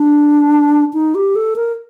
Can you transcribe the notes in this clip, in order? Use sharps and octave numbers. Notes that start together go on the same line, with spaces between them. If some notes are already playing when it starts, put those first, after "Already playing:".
Already playing: D4
D#4
G4
A4
A#4